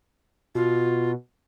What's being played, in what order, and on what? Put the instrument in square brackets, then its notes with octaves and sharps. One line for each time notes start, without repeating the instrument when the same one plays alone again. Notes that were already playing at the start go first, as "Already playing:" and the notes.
[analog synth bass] B2 [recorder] F4